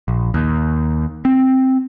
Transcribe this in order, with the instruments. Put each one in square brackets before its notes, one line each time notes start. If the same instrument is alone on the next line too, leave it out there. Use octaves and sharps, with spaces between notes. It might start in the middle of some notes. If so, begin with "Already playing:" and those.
[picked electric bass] A#1
D#2
C4